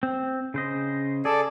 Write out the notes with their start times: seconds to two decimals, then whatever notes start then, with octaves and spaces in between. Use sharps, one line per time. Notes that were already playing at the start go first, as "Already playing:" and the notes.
0.03 C4
0.54 C#3 C5 D#5
1.25 G#4 A4 D5